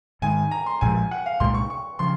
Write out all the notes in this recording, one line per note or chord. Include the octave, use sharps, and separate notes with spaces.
G#2 D#3 G#3 G#5
A#5
C6
A#1 A#2 F3 G#3 G#5
F#5
F5
C2 A#2 G#3 C6
C#6
C#6
C#3 F3 C6